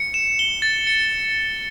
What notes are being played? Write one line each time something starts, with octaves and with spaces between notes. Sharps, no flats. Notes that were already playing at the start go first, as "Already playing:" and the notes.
Already playing: C#7
E7
G7
A6
C#7